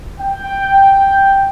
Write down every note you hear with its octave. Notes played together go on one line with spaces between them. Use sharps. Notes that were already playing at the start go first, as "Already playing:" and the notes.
G5